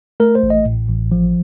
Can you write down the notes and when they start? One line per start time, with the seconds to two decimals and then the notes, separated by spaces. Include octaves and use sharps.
0.20 A3 A#4
0.35 C5
0.43 A1
0.50 D#5
0.65 A2
0.89 A1
1.12 F3